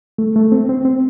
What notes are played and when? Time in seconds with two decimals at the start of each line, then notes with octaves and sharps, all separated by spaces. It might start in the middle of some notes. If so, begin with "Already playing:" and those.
0.18 A3
0.36 A3
0.52 C4
0.69 C4
0.85 C4